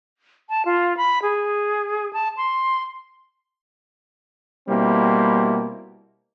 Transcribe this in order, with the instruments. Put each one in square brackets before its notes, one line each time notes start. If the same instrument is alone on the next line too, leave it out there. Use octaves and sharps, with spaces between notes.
[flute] A5
F4
B5
G#4
A5
C6
[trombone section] B2 G3 A#3 C4 E4